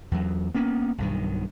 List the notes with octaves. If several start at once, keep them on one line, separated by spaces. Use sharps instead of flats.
E2 F#3
A#3 B3 C#4
B1 G2 D#3